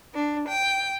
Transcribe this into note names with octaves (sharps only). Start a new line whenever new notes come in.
D4
G5